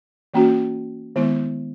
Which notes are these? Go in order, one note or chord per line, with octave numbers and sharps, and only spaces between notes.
E3 A#3 C#4 F#4
D#3 G#3 B3 E4